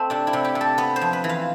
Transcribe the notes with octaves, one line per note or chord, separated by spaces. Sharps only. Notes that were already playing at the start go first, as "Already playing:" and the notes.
Already playing: A3 C4
C3 D4
E4
C3
G4
C3
A4
B3 B4
C5
F2
B4
E3
F5